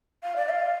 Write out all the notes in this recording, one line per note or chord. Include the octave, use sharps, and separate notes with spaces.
F5
D5
F5